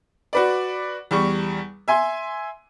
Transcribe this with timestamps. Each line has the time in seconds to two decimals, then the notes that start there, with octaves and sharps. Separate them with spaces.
0.33 F#4 B4 D5
1.11 E2 G3 C#6
1.88 E5 G#5 C6